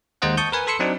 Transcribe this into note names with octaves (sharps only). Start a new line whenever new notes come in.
D#2 G#3 D#4 C5 D#5 F#5
A5 C#6 D#6 G6
A#4 B4 G#5
A4 B5 C6 E6 C#7
F#3 C4 D4 D#4